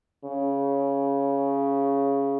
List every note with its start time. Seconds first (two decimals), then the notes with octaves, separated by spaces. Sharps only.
0.24 C#3